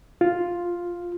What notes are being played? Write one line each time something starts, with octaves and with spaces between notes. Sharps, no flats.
F4